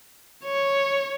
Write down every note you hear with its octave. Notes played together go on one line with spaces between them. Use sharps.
C#5